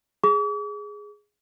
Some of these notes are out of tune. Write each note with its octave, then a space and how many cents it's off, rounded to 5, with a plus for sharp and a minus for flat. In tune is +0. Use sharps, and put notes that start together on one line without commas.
G#4 +0 D6 -45